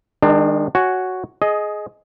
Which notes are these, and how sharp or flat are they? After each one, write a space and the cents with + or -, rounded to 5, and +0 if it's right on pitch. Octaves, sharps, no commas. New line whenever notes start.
D#3 +0 G#3 -30 D4 +30
F#4 +0 C#5 +0 G#5 +0
G#4 +20 D#5 +0